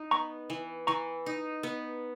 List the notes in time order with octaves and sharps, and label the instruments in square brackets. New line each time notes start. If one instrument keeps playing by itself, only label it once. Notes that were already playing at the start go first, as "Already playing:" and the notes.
Already playing: [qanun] D#4
[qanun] B3 [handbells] A#5 C#6
[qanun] E3
[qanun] E3 [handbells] A#5 C#6
[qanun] D#4
B3